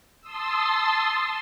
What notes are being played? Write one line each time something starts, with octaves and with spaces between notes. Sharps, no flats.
A5 C6 D#6 E6